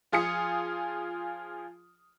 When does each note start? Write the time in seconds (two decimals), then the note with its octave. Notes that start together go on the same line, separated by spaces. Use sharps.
0.12 F3 F4 G#4 D#6 C#7